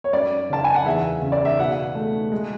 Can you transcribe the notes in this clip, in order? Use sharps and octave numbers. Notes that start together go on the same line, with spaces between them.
C#5
F#2 D5
C#3 A5
G#5
F#5
E2 E5
C#3
D5
E5
B2 F#5
A3
G#3